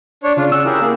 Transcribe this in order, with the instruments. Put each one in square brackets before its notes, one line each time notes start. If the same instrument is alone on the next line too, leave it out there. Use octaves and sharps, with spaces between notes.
[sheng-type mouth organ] D4 C#5
[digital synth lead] C#3 [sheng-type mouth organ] D4 F4
[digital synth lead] C#4 [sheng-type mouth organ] F#5 [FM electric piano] E6
[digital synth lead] E4 [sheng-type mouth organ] G4 G#4 A#4
[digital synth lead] A#3 [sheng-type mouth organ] G#4